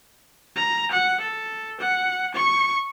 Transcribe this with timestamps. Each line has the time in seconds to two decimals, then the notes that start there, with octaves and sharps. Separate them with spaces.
0.56 A#5
0.91 F#5
1.21 A4
1.81 F#5
2.35 C#6